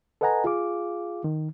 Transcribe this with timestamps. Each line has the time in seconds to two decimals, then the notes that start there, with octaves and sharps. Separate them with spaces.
0.21 A4 B4 D#5 F#5 G#5 A#5
0.44 F4 G#4 F5 D6
1.24 D#3